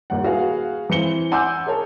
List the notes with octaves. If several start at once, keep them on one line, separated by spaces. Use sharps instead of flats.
D#1 D#2 F#5
F#4 G#4 B4 F5
E3 C4 C#7 G7
F#5 G#5 C6 D6 E6 G6
G#4 A#4 C#5 A5